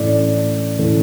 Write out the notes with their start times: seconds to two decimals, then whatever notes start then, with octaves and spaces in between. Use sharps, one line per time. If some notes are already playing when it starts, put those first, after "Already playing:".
Already playing: A2 E3 A3 C#4 D5
0.78 A2 E3 A3 C#4